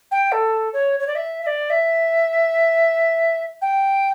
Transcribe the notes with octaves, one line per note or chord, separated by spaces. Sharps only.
G5
A4
C#5
C#5
D5
E5
E5
D5
E5
G5